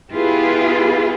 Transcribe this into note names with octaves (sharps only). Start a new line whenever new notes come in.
B3 E4 F4 G4 G#4 B4